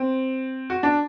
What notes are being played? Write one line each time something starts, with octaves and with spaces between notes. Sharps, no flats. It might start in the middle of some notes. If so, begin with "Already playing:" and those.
Already playing: C4
F#4
D4